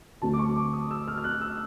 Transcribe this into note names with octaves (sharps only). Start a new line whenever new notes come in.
D2 D3 F#3 A3 C4 A5
D6
C#6
D6
D#6
E6
F6
F6
F#6
E6